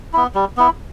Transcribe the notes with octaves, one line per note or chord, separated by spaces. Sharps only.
B3 E4
G3
B3 E4